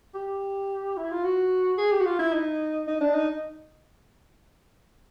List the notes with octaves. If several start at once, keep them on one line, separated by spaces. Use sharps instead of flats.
G4
E4
F4
F#4
G#4
G4
F#4
F4
E4
D#4
D#4
D4
D#4